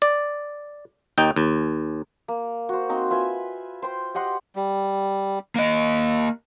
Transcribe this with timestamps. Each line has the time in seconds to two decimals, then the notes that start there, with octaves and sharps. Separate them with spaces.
0.02 D5
1.18 D#2 D#4 G5
1.36 D#2
2.28 A#3
2.69 F#4 C5
2.89 A#3 C4 D#4 A#4
3.10 F4 B4 E5 G#5
3.82 C5 G5 C6
4.14 G4 D#5 F#5 C6
4.56 G3
5.56 A#3 D#5